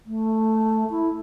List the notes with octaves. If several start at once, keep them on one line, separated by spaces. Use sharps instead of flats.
A3
E4